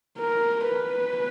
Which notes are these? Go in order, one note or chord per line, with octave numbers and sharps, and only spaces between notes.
A#4
B4